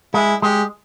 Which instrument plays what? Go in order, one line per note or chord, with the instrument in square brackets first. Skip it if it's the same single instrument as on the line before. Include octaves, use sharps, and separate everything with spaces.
[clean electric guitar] G#3 [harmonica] E4
[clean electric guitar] G#3 [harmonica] G4